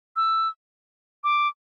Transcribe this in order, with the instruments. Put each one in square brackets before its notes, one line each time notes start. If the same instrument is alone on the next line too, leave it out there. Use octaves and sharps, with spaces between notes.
[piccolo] E6
D6